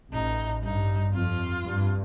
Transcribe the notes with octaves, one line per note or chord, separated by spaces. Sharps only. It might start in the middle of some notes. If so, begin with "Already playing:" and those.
A1 A2 D#4
G2 D#4
F2 F4
G2